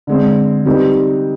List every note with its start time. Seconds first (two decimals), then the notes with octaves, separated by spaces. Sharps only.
0.07 D3 G#3 C4
0.65 G3 C4 D#4 G4 B4